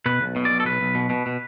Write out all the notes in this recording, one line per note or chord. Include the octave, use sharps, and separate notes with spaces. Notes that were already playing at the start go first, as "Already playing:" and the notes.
B2 B4
B1
B2
B1 D5
A4
B1 B4
B1
B2
B2
B2